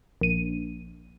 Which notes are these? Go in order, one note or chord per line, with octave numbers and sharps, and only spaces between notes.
A#1 D#7